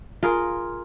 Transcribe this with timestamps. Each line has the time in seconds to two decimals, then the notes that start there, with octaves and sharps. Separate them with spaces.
0.23 F4 G#4 A#4